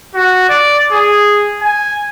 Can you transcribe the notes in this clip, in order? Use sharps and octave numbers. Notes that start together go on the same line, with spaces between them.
F#4
D5
G#4
G#5